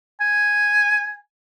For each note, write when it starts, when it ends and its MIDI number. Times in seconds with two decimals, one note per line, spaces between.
0.21 1.16 80